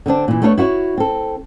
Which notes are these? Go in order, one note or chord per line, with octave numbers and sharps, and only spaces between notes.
D3 B3 C4 D4
A#2 E3
A3 B3 D4 A4 C#5
E4 F#4 B4 C#5
C4 A4